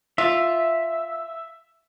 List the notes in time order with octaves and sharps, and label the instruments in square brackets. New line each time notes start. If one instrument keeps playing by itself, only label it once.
[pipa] F4 [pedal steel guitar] E5